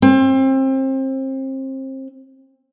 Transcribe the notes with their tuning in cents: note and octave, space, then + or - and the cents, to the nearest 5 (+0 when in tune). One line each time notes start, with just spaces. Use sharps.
C4 +30